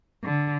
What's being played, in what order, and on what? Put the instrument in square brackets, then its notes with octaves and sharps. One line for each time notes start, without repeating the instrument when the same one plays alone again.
[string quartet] D3